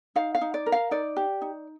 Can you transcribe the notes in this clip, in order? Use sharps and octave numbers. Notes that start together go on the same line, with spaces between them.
D#4 F5
F5
D#4
D5
A#4
F5
D#4 D5
G4
D#4